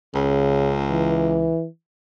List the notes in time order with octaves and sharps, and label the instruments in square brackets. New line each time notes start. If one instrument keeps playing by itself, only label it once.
[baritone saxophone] C#2 [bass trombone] C#3
[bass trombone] E3